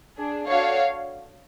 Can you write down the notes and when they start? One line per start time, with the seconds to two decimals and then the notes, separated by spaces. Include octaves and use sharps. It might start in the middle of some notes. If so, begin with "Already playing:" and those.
0.18 D4 G#4
0.47 D4 F#4 A4 C#5 F5